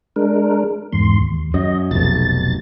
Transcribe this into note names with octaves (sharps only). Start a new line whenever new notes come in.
G#3 D4 A#4
E2 G#2 C6
D#2
F#2 D#5
F1 B1 A6